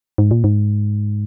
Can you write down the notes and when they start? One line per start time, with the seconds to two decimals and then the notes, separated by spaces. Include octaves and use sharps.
0.18 G#2
0.31 A#2
0.44 G#2